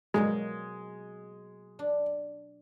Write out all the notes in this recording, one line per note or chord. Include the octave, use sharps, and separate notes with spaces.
B2 F#3 G#3 A#3
D4